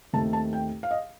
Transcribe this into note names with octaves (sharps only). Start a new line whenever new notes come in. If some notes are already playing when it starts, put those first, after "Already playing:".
D#2 D#3 A3 C4 A5
A5
G5
F5
D#5